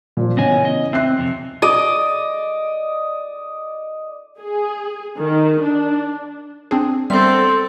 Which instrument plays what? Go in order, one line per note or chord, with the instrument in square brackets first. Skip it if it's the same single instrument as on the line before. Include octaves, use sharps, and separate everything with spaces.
[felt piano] A#2 F3
[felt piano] A1 C#3 [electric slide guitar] B3 D#5 G#5
[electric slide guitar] D#5
[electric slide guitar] C4 [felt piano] E5 F#6 C7
[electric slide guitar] F2 C3
[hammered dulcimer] D5 D#5
[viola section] G#4
D#3
D4
[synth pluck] C4 D4 G#4
[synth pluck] G3 B3 E5 [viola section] C4 A4 A#4 [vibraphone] C5 C6